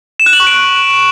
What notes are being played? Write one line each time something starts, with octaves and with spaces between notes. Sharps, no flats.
E7
F#6
F#7
C#6
D7